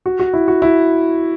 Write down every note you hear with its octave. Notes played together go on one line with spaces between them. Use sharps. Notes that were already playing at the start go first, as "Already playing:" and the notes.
F#4
F#4
E4
F#4
E4